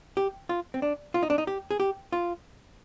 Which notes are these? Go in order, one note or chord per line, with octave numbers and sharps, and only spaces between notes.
G4
F4
C4
D4
F4
D#4
D4
D#4
G4
G#4
G4
F4